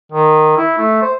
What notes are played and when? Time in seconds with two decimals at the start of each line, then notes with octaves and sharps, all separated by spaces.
0.12 D#3
0.57 E4
0.78 A3
1.02 C5